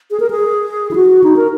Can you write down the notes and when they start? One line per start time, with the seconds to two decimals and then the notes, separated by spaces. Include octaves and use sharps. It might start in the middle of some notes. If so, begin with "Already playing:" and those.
0.11 G#4
0.20 A#4
0.30 G#4
0.91 E4
0.95 F#4
1.24 D#4
1.36 A#4